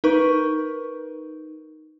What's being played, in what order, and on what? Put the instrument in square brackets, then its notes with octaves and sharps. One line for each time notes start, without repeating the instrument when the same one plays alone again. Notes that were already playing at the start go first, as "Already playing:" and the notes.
[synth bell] D#4 A#4 B4 C#6